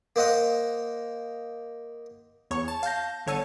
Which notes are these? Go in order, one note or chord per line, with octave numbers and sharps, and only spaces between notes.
A#3 C5 D#5 F#5 D#6
E2 C#5 C#6
A5
F5 A5 G6 A#6
G1 D3 C#5 A5 E6 D#7